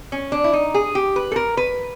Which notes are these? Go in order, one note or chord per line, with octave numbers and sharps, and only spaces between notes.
C#4
D4
E4
D#4
G#4
G4
B4
A4
A#4
B4